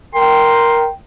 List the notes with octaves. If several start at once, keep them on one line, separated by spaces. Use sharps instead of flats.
A#4 G5 C6